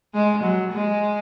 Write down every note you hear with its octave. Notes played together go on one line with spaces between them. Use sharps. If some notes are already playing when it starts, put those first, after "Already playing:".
G#3
F#3
G#3